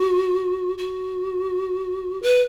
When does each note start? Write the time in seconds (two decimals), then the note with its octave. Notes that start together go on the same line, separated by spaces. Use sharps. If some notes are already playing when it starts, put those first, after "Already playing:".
Already playing: F#4
0.78 F#4
2.22 B4